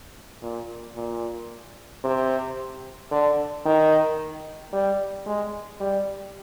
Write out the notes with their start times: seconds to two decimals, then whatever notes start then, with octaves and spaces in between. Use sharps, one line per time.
0.42 A#2
0.95 A#2
2.04 C3
3.11 D3
3.65 D#3
4.73 G3
5.26 G#3
5.80 G3